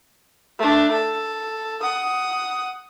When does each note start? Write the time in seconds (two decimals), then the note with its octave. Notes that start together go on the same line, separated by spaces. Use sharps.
0.59 A3 D4
0.91 A4
1.82 F#5 D#6